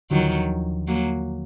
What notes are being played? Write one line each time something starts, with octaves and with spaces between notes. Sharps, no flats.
D#2 D3 D#3 F3 F#3
F#3 A#3